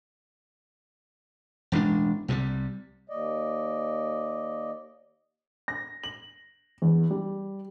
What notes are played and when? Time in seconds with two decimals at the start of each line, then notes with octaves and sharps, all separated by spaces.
1.72 E1 A1 G#3 D4
2.28 C2 C3 E3 G3
3.09 D#2 D5 D#5
5.68 A#6
6.03 F#7
6.82 E2
7.11 G3